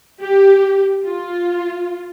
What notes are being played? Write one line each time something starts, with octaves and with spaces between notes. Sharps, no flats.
G4
F4